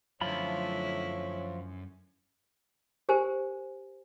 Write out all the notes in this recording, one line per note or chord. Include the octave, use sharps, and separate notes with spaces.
F#2 D3 F3 A3 E4 F4 C#5 B5
G4 A#4 C5 G#5